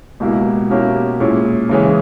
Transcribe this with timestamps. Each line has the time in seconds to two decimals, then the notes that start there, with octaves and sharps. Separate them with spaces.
0.20 C#2 B2 A#3 E4 G4
0.70 B2 A#3 C#4 E4 G4
1.20 A#2 G#3 C#4 E4
1.69 C#3 E3 G#3 C#4 G#4